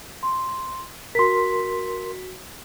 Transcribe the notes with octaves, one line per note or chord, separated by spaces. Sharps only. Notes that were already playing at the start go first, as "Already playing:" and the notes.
C6
F#4 A#4 C6 B6